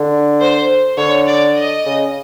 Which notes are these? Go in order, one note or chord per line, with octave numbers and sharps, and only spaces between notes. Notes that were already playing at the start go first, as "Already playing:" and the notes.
Already playing: D3
C5
D3 C#5
D5
D#5
C#3